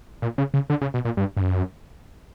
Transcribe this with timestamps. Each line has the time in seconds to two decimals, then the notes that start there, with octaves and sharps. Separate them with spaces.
0.22 A#2
0.38 C#3
0.54 C#3
0.70 D3
0.81 C#3
0.94 B2
1.05 A#2
1.17 G2
1.37 G2
1.41 F#2